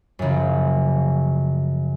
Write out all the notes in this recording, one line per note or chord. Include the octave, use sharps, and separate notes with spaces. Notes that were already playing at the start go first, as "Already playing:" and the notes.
F#2 C#3 F3